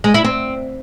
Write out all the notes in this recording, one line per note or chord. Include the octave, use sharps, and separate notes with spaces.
G#3
E4
C4